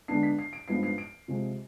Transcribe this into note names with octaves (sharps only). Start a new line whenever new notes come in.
D3 G#3 B3 D4 C7
B6
C7
D7
G2 F3 G#3 B3 D#4 C7
C7
D7
C3 F3 G#3